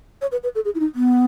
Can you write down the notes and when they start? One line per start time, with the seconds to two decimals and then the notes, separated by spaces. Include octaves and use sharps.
0.22 C#5
0.32 B4
0.43 B4
0.55 A4
0.65 G#4
0.75 E4
0.80 D#4
0.95 B3